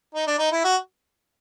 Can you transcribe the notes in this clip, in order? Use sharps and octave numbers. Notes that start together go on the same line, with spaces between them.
D#4
D4
D#4
E4
F#4